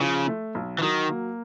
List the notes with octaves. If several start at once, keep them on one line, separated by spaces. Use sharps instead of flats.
C#3 F3
A3
B1
E3
D#3 F#3
A#3